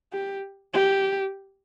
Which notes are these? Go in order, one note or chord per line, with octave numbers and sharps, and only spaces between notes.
G4
G4